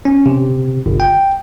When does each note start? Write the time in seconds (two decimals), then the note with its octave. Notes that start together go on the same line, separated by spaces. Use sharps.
0.05 C#4
0.26 C3
0.86 G1
1.00 G5